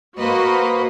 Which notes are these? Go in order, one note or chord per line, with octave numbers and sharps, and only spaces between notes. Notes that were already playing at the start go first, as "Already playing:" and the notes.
A#3 F#4 B4 C5 D#5